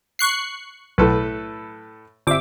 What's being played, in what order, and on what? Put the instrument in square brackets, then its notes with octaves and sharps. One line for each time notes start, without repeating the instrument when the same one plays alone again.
[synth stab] C#6 F#6 C7
[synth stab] B1 [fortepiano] A2 A4 B4
[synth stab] G1 D6 [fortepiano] C4 E5